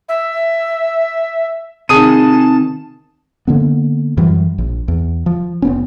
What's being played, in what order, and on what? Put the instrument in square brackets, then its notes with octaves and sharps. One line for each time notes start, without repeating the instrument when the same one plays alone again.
[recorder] E5
[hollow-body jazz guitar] C3 D#3 [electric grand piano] G#4 D#6 D#7 [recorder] A5
[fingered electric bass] D3 A#3 B3
F#2 E3 F#3 G3
A#1
E2
F3
F1 B3 C#4